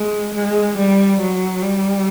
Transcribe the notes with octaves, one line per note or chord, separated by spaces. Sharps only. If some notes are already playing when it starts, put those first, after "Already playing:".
Already playing: G#3
G#3
G3
F#3
G3